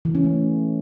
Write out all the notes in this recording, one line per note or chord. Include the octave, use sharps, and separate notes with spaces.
E3
C#4
A3